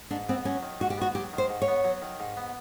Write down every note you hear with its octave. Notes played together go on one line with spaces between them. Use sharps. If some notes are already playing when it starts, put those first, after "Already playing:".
G#2 D4
B3 C4
F#3 C#4
D#3
G#2 F#4
G4
B3 F#4
F#3 G4
D#3
C5
G#2
C#5
B3
F#3
D#3
G#2
B3